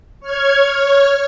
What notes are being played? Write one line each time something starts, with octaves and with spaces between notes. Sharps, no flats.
C#5 F6 G#6